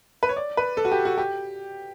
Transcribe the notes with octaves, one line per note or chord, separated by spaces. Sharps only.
B4
C#5
D5
B4
A4
F#4
G4
F#4
G4